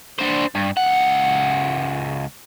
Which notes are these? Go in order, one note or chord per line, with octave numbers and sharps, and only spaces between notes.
D4 C5
G2
C#2 F#5